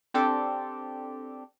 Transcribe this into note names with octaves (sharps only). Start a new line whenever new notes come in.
C4 D4 G4 A4